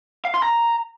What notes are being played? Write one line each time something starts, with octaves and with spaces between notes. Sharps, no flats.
F5
C6
A#5